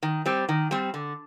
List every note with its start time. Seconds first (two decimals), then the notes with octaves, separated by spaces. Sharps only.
0.03 D#3
0.26 G3 C4
0.49 D#3
0.71 G3 C4
0.94 D3